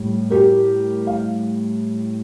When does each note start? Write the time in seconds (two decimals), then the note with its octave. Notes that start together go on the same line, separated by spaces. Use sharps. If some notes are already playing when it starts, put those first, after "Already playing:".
Already playing: A2 G3
0.30 G4 A#4
1.07 F5